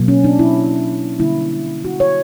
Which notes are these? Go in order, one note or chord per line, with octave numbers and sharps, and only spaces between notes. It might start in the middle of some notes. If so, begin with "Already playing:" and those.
Already playing: B2 F#3 A#3
C#4
D4
E4
D3 G3 A#3 E4
F#4
C#5